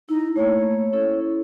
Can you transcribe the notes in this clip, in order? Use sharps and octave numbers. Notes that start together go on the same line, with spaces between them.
D#4 E4
A3 A#3 C#5
C#4 E4 A4